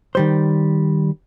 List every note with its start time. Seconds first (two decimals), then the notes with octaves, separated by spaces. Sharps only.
0.15 D#3 G3 C5